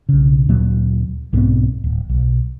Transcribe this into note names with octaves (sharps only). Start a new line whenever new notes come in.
B1 C#3
D2 A#2 F#3 A#3
B1 G#2 B3 C4
D1
B1